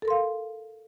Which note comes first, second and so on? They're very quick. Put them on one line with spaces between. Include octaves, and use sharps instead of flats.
A4 A#4 C6 F5